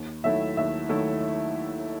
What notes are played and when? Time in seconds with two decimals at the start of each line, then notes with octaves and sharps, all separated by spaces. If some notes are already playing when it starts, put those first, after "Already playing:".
Already playing: D#2
0.24 D#3 F#3 A3 E4 E5
0.57 D#2 E5
0.89 D#3 F#3 A3 E4